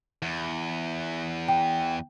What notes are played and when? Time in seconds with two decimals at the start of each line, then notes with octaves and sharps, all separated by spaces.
0.22 E2
1.48 G5